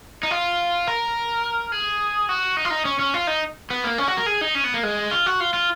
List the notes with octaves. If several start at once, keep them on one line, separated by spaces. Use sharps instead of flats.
D#4
F4
A#4
G#4
F#4
D#4
F4
D#4
C#4
C#4
F4
D#4
B3
A#3
C#4
F#4
A#4
G#4
D#4
C#4
B3
A#3
G#3
F4
F#4
F4
F4